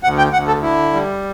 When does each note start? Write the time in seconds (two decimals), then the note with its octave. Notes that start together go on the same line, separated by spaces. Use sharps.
0.03 D2 F#5
0.18 G5
0.33 D2 F#5
0.47 A4
0.62 D3 E4
0.93 G3